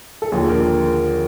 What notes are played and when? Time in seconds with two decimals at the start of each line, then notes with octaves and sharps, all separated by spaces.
0.22 A4
0.32 D#2 D3 F3 G#4
0.49 A#4